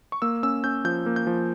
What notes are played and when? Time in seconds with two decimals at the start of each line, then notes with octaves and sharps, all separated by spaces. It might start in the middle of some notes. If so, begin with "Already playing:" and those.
0.12 C#6
0.22 A#3 E6
0.43 C#4 E6
0.64 C#4 G6
0.85 F3 G6
1.06 A#3
1.16 G6
1.27 F3